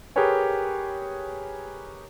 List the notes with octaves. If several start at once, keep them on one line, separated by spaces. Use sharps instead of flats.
G4 G#4 A#4 B4 C#5 G#5